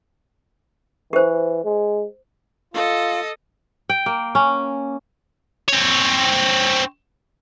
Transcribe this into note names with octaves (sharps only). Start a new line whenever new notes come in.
E3 G4 C5
G#3
F4 A4 D#5
G5
A#3
C#4
C4 C#5